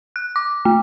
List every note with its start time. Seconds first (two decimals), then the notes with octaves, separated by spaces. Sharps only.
0.16 F#6
0.36 D6
0.65 A3